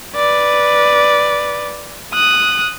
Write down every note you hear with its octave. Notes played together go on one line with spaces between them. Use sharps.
B4 D5
D#6 F#6